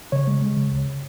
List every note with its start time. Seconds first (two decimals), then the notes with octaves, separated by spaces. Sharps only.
0.12 C#3 C#5
0.27 G#3
0.42 G#3
0.57 C#3
0.72 C#2